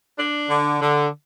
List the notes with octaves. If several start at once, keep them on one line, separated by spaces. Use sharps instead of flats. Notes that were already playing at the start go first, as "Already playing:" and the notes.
D4
D3
D3